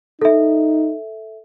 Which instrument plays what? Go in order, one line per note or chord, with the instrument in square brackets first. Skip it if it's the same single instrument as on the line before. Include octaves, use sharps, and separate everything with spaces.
[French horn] D#4 [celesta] A4 E5